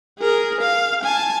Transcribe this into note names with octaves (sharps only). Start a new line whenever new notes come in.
G#4 A#4
F5
G#5 A5